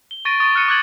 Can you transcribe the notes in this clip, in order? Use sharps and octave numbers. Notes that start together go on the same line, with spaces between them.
G7
C#6 A6 A#6 D7 D#7
C#6 D#6 A6 D7 G7
D#6 F6 F#6 A6 C#7 D#7
D6 F#6 G#6 A6 F#7